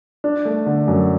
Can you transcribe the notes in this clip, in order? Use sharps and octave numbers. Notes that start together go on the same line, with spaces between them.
D4
A3
D3
F#2